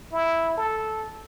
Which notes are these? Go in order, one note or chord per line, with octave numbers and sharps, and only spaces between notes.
E4
A4